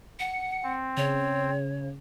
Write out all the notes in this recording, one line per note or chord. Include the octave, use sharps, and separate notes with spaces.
F#5 C#7
C4
C#3 C#5